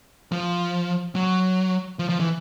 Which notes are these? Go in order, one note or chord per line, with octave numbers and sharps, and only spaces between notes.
F3
F#3
F3
F3
E3